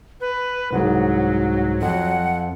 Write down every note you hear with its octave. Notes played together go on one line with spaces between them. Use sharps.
B4
C2 G#2 F#3
F2 F#5